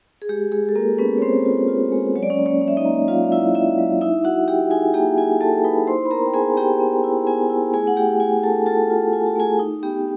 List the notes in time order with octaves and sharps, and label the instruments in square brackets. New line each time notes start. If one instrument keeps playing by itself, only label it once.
[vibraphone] G#4
G#3 G4
G#3 G#4
A4
A#3 F4 A#4
B3 C#4 B4
C#5
C4 C#4 C5
F4
F4
G#3
F#3 C#5
D5
C#4 C#5
A#3
C#4 C#5
C#4
E5
D#4 D#5
A#3
F#3 F4 F5
F5
F#3 E4 E5
F#3 E4 E5
F#3
D#4 E4 E5
D#4 F#4 F#5
F#4 G4 G5
D#4 G#4 G#5
A#3 G4 G5
A#3 G#4 G#5
A#3 A4 A5
D#4 B4 B5
E4 C5 C6
B5
B3 A#4 A#5
G5
B3 G#4 G#5
B3 G4 G5
B3
E4
B3 G#4 G#5
E4
A3 G#4 G#5
F#5
A3 G4 G5
A3 G#4 G#5
D4 A4 A5
F4 A4 A5
F4
F4 G#5
A5
A3 G#4 G#5
D#4
B3 G4 G5